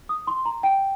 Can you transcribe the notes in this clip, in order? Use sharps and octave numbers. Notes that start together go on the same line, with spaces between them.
D#6
C6
A#5
G5